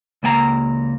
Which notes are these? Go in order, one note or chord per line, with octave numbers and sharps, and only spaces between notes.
C#2 A#3 G5 A#5